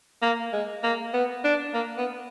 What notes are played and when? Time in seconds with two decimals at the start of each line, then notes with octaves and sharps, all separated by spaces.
0.22 A#3
0.53 G#3
0.83 A#3
1.14 B3
1.44 D4
1.74 A#3
1.98 B3